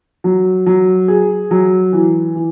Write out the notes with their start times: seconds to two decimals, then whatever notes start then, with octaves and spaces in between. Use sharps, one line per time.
0.24 F#3
0.66 F#3
1.08 G#4
1.51 F#3
1.93 E3
2.35 E3